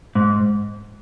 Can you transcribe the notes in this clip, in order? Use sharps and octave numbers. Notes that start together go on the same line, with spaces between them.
G#2